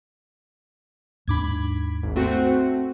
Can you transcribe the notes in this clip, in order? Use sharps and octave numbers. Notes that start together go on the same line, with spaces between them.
D#2 G#2 D4 B5 D6 G#6
G#1
A3 C4 F#4